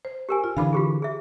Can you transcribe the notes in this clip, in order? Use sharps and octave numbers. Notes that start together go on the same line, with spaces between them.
C5
G4 A#4 G#5
F4
D3 E3 D4 F5 B5 D6
F4 G4 G#4
G#4 E5